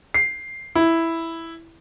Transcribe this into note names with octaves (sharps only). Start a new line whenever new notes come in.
C7
E4